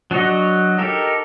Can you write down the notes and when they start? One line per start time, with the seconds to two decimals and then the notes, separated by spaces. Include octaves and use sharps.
0.11 F#3 D4 F#4 C#5 D#5
0.78 D#4 G4 A4 A#4